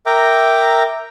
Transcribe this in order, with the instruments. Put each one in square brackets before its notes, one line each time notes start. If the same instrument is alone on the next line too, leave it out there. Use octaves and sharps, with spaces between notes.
[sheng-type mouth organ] A#4 E5 G5 A#5 D6